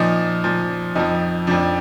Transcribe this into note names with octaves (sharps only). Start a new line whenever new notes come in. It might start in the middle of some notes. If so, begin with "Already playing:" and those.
Already playing: A#2 F3 D#4
A#2 F3
F2 F3 D#4
F2 F3 D4